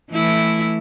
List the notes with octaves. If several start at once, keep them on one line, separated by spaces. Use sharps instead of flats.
E3 A3 E4